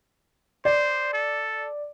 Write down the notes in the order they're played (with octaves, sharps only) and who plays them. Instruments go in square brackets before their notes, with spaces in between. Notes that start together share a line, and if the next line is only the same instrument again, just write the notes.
[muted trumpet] C5 [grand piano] D5
[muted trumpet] A4